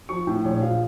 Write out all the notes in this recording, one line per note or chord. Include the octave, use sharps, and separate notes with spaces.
F3 C#6
A2
A#1 C#5
F3 F5